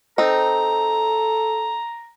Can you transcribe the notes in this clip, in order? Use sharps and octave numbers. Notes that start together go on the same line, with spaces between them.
C4 D#4 A4 A#5